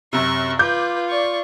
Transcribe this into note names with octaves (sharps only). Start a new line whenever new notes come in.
F#2 C3 C#6
F4 B4 D6 G6
D5 C#6